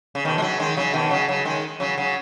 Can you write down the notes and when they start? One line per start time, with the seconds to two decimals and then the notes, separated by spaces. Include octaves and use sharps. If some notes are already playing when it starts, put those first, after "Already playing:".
0.15 C#3
0.25 B2 D#3
0.38 G#3
0.42 C#3 F#3
0.60 D#3 G#3
0.77 C#3 F#3
0.94 B2 D#3
1.11 C#3 F#3
1.29 C#3 F#3
1.45 D#3 G#3
1.80 C#3 F#3
1.98 C#3 F#3